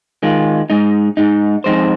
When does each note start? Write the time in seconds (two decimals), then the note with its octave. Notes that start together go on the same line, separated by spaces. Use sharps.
0.23 D#3 G#3 F4
0.70 G#2 G#3 D#4
1.17 G#2 G#3 D#4
1.64 F2 C3 G#3 D#4 C5